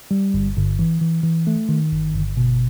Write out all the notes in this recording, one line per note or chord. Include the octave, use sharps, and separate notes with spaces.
G3
G1
G1
E3
E3
E3
A3
D#3
G1
G1
B2